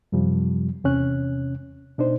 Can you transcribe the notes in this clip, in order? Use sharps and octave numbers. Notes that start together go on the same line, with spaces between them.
F#2 C3 F3 G3
E2 C3 C#4 F#6
B2 D4 D#4 C5